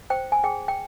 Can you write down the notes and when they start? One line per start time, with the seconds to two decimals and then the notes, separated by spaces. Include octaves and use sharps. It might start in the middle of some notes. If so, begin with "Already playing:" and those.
0.10 C5 G5
0.32 G#5
0.44 G#4 G5
0.68 G5